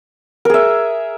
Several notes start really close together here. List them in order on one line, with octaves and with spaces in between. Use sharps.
A#4 G#4 E5